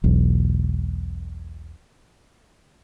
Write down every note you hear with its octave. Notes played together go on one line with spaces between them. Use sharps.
E1 B1